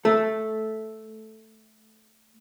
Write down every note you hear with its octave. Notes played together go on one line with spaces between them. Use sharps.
A3 A4